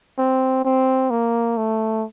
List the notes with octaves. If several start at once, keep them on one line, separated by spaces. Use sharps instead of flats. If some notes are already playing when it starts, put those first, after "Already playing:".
C4
C4
A#3
A3